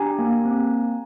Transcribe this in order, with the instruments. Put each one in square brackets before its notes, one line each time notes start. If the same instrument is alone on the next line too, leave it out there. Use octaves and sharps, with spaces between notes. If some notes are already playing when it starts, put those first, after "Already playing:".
Already playing: [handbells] D4 G4 G#5 A#5
A#3
C4